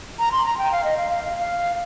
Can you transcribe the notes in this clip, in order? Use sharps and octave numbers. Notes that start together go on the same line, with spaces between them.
A#5
C6
A#5
G5
F5
D#5
F5
F5
F5
F5